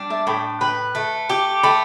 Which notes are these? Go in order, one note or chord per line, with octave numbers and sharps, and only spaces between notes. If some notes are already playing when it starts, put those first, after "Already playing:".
Already playing: G3 D4
E5 A5
A2 G5 B5
B4 G5 B5
A3
G4
A3 G5 B5